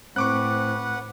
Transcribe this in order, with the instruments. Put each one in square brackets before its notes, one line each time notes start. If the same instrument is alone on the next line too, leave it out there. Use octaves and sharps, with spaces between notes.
[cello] A2 [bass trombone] C4 [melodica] B4 F#5 [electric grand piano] C#6 D6 F#6